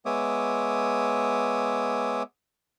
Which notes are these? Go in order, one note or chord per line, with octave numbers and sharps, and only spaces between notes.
G#3 B3 C#5 E5 D6 D#6